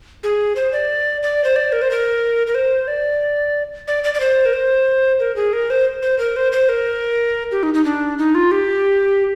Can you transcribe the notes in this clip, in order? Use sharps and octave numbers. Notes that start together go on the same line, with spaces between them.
G#4
C5
D5
D5
C5
D5
A#4
C5
A#4
A#4
C5
D5
D5
D5
D5
C5
A#4
C5
A#4
G#4
A#4
C5
C5
A#4
C5
C5
A#4
G4
D#4
D#4
D4
D#4
F4
G4